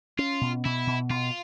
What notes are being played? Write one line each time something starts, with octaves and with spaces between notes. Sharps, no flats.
C#4 F4
B2
B2 E4
B2
B2 F4